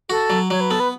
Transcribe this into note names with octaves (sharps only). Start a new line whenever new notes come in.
F#4 A4
F#3
F#3 C#5
B4
B3 A4
B4